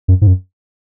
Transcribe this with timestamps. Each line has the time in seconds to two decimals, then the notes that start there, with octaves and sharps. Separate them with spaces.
0.08 F#2
0.21 G#2
0.27 F#2